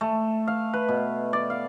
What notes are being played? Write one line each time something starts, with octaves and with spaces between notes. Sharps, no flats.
A3
F5
B4
B2
D5
F5